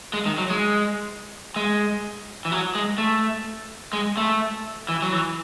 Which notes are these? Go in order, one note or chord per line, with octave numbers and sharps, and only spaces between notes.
G#3
D#3
F#3
G#3
G#3
E3
F#3
G#3
A3
G#3
A3
E3
F#3
E3